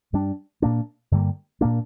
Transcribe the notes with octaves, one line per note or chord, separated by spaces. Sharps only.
G2 G3 D4
A#2 A#3 D4
G2 D3 G3 A#3
A#2 A#3 D4